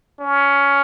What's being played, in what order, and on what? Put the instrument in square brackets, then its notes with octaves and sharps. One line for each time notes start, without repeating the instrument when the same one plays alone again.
[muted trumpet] C#4